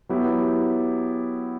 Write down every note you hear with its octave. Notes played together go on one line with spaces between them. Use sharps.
F#3 B3 E4 G4